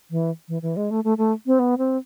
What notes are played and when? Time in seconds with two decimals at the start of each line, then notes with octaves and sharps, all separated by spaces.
0.11 E3
0.49 E3
0.62 E3
0.77 G#3
0.91 A3
1.04 A3
1.18 A3
1.47 C4
1.59 B3
1.78 C4